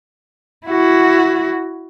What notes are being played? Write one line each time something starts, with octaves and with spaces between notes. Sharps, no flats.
E4 F#4